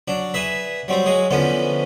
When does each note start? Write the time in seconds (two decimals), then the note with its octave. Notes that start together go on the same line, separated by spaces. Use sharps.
0.08 F#3 D4
0.34 G#4 B4 E5
0.88 F#3 G3 C4
1.06 F#3 G#3 G#4
1.30 D3 E3 F3 B3 C#4